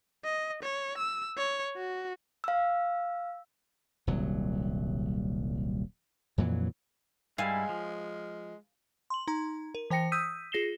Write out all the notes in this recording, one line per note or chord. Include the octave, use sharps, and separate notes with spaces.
D#5
C#5
E6
C#5
F#4
F5 E6
D#1 C2 F#3
F2 A#2 E3 F#3
G2 G3 G#3 E4 F5 G#5
F3
C6 F#7
D#4 A#5 C6
A#4
E3 C5 G5 A#6 C#7
D#6 E6 G6 B6 D#7
F4 G#4 A#6 C7 E7 G7